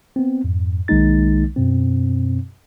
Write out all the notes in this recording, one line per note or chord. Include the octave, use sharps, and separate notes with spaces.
B3 C4
F2 G#2
B1 D#3 G#3 A#3 D#4 A6
F#2 B2 C4